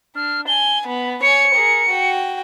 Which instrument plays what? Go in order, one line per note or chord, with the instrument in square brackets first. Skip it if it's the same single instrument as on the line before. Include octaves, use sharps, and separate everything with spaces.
[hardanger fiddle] D4 [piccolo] F6
[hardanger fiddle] G#5 [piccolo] G7
[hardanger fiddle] B3 [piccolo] B5
[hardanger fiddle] C#5 G#5 [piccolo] C#7
[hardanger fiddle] G#4 A#4
F#4 G5